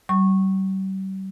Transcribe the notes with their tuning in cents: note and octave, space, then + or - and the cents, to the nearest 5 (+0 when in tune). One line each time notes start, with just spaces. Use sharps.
G3 -40 C#6 -15